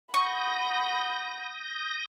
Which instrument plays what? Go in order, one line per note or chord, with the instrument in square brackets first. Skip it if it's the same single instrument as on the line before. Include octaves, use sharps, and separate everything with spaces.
[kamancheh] F#5 B5 [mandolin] C#6 [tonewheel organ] D#6 G6 A#6